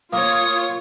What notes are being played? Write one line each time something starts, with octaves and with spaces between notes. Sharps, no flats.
A#3 F4 C#5 D#6